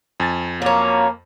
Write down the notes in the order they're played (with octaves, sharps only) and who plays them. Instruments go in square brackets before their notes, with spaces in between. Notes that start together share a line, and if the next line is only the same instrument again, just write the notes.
[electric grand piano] F2 G#5 A6
[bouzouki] F#3 C#4 [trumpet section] A#3